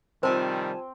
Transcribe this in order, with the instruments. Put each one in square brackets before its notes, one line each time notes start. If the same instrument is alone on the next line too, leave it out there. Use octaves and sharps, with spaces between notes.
[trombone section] C3 D#3 G3 [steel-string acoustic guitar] F3 G#5 A5 [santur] C4 [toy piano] C5